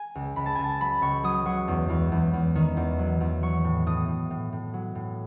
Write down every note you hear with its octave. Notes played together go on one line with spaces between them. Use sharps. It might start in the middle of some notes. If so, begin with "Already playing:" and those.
Already playing: G#5
C#2
C#2 B5
A5
C#2 G#5
A5
F#3 B5
C#2 C#6
F#3 D#6
F#3 C#6
E2
E2
E2
E2
D#3
E2
F#3
E2
F#3 C#6
A2
A2 D#6
A2
A2
A2
F#3
A2